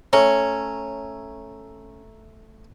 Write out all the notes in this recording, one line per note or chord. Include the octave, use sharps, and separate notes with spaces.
A3 C#4 C#5 A#5